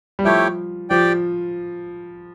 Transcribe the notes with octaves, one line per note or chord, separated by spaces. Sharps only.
G3
F3 A3 E4 G4 C#5 G5
F3 G4 D5 G5